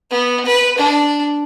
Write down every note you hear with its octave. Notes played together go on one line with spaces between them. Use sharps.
B3
B4
D4